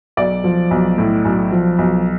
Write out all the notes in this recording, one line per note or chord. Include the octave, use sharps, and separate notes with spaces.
B1 D5
F3
B1
A2
B1
F3
B1